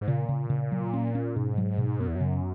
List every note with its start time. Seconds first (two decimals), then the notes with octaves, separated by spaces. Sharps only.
0.01 G#2
0.08 A#2 C#3
0.29 C#3
0.50 C#3
0.72 F#3
0.94 C#4
1.15 C#4
1.36 G#2 B2
1.58 F#3
1.78 B2
2.00 F#2 B3
2.08 E2
2.15 F#2
2.21 C#3